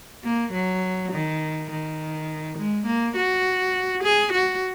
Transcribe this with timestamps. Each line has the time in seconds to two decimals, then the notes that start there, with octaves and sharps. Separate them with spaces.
0.24 A#3
0.53 F#3
1.12 D#3
1.70 D#3
2.58 G#3
2.86 A#3
3.16 F#4
4.04 G#4
4.33 F#4